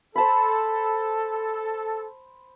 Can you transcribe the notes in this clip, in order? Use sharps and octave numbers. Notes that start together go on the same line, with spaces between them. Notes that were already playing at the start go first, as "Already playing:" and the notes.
A4 C5 A5 B5